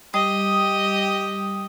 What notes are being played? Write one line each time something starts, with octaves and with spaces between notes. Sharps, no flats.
G3 G4 D#5 D#6